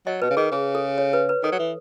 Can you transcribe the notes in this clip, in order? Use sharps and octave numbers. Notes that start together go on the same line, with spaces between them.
F#3 D#5
B2 B4
C#3
D#3 G#4
C#3 G#4
A4
C#5
B4
B4
D#3 A4
F#3
E3